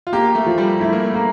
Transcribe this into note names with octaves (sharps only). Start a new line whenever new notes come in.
F4
A#3 G4
A3
F3
G3
A3 E4
A#3
A3
A#3